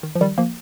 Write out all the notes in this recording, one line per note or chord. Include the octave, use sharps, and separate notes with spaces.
D#3
F3
D#3 G3
F3 A#3